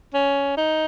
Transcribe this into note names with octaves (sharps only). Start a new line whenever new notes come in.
C#4
D#4